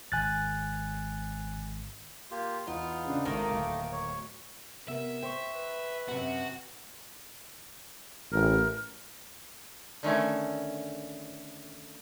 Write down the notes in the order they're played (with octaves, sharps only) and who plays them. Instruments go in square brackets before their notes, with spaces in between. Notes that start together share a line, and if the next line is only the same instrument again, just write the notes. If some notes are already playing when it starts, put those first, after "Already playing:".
[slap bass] G#1 [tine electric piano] G#5 F#6 A6
[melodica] A#3 F4 G4
[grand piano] E2 [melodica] B3 D#4 [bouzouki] F4
[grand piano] C#3 D4
[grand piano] G#1 [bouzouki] D#3 A#3 [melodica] A3 D#4 D#5
[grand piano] D1
[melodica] C#5
[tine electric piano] C3 B3 A#4 [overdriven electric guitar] E5
[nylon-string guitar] C5 [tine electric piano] G5 C#6
[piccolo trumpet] B4
[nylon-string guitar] F#2 C3 B3 [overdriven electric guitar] F#4
[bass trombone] A1 [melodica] A#4
[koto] D3 D#3 A3 C#4